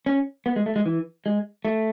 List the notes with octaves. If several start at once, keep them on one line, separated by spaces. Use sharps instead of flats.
C#4
B3
G#3
A3
G#3
E3
G#3
A3